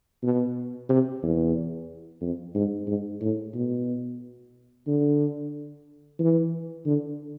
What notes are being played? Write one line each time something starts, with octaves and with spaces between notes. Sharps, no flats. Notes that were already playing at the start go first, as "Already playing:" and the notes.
B2
C3
E2
F2
G#2
G#2
A2
B2
D3
E3
D3